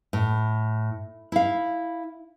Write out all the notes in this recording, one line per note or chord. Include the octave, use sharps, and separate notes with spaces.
A2
E4 F5